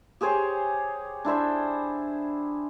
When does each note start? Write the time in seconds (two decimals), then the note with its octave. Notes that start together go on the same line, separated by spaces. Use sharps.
0.21 G4 G#4 C5 C#5
1.25 D4 E4 C5 E5